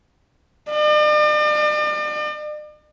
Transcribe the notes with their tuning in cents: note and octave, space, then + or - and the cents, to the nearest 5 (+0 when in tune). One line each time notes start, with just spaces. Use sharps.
D5 +45